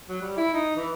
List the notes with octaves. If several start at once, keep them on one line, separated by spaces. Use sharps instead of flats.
F#3
G3
E4
D#4
E3